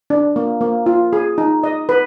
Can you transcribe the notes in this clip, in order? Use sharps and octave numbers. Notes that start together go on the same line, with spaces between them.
D4
A#3
A#3
F4
G#4
D#4
D#5
B4